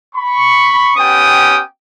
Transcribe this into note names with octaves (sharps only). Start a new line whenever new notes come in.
B5 C#6
B3 C#4 G4 G5 D#6